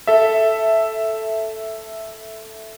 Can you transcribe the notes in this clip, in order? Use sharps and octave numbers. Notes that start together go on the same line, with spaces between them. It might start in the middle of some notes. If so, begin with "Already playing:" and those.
A4 E5